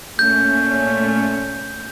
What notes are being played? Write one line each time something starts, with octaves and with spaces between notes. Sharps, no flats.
A#2 A3 C#4 G6